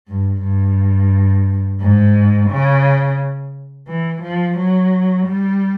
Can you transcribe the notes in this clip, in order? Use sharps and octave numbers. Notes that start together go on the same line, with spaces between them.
G2
G2
G#2
C#3
E3
F3
F#3
G3